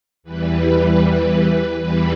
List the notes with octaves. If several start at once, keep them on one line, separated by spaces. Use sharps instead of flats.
E2 E3 G3 B4
E2 E3 G3 B4